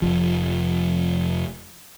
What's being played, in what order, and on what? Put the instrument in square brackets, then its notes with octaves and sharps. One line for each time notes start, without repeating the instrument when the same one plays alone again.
[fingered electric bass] F1 F3